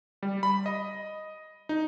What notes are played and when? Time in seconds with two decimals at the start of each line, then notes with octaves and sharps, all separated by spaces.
0.23 G3
0.43 B5
0.66 D#5
1.69 D#4